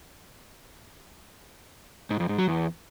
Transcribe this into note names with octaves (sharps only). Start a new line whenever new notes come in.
G#2
F2
G#2
F#3
E2